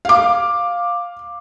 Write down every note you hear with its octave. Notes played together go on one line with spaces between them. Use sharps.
F5 D6